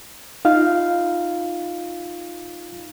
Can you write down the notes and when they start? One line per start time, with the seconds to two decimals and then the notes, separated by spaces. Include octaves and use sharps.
0.45 D#4 F4 F5